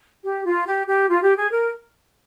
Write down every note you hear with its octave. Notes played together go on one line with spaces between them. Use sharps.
G4
F4
G4
G4
F4
G4
G#4
A#4